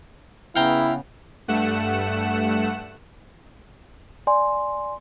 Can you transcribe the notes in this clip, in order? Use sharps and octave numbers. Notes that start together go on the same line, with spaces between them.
C#3 B3 E4 F5 G5 A#5
G2 A3 F#5 E7
D5 G#5 C6